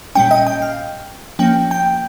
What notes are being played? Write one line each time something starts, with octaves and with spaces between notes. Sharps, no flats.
A#2 G3 C#4 G5
D#5
G5
F5
F3 A#3 C#4 G5
G5